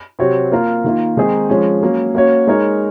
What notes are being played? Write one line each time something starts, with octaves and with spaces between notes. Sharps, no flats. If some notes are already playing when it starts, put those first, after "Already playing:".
C3 F#3 C4 F#4 C#5
A#3 F4 A#4
D#3 A#3 F4
D#3 G#3 C4 D#4 G#4
F3 G#3 C#4
F#3 A#3 C#4
A#3 C#4 F#4 C#5
G#3 D#4 A#4 C#5